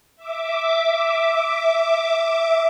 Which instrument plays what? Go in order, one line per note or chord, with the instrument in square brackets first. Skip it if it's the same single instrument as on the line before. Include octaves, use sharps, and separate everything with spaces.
[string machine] E5 D6